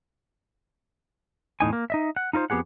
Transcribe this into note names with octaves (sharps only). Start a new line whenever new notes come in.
E2 A2 D#4 G#5
A#3
D#4 D#5 E5
F#5
D#4 F4 A#4 C5
F2 B3 G4 G#4 F#5